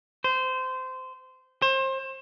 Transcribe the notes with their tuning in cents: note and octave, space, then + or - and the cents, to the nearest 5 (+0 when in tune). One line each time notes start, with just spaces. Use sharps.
C5 -20
C5 +30